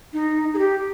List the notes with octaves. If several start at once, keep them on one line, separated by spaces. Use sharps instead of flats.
D#4
G#4
G4